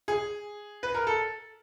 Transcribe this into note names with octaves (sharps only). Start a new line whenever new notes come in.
G#4
B4
A#4
A4